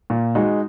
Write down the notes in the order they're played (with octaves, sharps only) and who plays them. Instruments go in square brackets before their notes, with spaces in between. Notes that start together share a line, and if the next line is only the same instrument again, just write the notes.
[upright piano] A#2
G#3 D#4 F#4